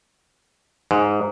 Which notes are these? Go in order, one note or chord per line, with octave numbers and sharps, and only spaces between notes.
G#2